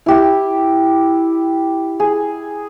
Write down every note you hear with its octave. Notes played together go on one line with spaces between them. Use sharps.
E4 G4 E5
G#4